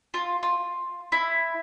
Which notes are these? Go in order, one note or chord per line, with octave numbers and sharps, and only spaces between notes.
F4
F4
E4